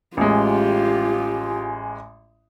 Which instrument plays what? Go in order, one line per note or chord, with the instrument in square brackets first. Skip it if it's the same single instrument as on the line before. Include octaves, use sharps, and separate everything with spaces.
[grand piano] A1 G#3 [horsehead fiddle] F4 G4